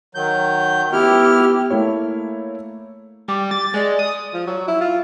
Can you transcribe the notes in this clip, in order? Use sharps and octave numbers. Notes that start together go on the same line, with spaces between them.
D#3 F#3 G6
B3 E4 G4 F6
A3 A#3 E4 C#5
G3 D6
A6
G#3 D5
D#6
F3
F#3
E4
F4